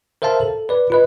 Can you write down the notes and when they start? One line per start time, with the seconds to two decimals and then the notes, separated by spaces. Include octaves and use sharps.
0.22 A#4 C5 E5 F5 A5
0.41 A4
0.69 B4 D5
0.90 F4 B4 D#5